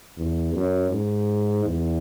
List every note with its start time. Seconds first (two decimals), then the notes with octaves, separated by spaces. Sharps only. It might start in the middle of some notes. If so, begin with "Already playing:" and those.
0.17 E2
0.54 F#2
0.91 G#2
1.65 E2